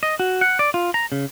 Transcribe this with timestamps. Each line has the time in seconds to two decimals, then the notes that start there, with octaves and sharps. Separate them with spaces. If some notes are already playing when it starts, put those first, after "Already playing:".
0.03 D#5
0.20 F#4
0.41 F#5
0.59 D5
0.74 F4
0.94 A#5
1.12 C#3